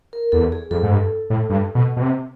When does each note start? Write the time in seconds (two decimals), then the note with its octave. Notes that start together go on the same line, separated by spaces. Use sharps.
0.13 A#4
0.32 E2 A4
0.52 G#4
0.71 F2 A4
0.83 G#2
0.91 G2
1.30 A2
1.50 G2
1.75 B2
1.97 B2
2.02 C3